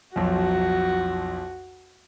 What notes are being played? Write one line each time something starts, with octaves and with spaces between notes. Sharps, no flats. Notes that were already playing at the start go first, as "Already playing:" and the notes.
B1 F2 F#4